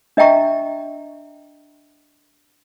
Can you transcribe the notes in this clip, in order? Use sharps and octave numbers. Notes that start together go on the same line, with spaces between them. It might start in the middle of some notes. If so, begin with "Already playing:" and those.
D4 D#5 E5 G5 A#5 C#6